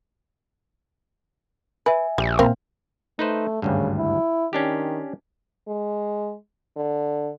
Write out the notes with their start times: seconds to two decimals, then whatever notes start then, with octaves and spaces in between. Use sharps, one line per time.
1.86 B4 E5 G#5
2.18 A#1 G3
2.39 A#2 C4 A#4 F5
3.19 A3 D#4 B4 C5
3.62 G#1 D2 G2 C#3
3.97 E4
4.53 D#3 C#4 D4 G4
5.68 G#3
6.77 D3